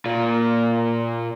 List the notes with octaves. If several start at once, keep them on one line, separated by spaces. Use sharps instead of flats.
A#2 F4